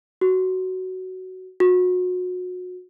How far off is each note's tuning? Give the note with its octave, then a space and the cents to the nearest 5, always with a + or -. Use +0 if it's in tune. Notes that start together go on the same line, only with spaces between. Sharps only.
F#4 +10
F#4 -30